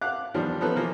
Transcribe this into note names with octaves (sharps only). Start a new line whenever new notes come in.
F5 F#5 D6 F#6
E2 D#3 F3 G3 B3 D4
F3 B3 C#4 D#4 A4 B4
E3 F3 A#3